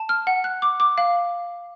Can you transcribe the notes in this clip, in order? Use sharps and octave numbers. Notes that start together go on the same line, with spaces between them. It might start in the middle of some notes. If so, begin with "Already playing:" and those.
Already playing: A5
F6
F#5
F#6
D6
D6
F5